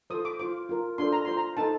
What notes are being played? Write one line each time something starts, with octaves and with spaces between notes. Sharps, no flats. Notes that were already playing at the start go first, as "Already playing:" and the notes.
F4 A4 C5 D#6
D6
F4 C5 D6
F4 A#4
D4 F4 A4 C5 C6
A#5
F4 C5 C6
A#5
D#4 A4 C5 A5